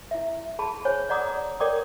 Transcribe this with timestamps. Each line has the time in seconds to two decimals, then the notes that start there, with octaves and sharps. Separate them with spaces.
0.11 E4 E5
0.59 G#4 A5 B5
0.85 C5 C#5 G#5
1.09 C#5 D5 F#5 A#5 D6 D#6
1.60 A#4 C#5 D5 G5 D6 D#6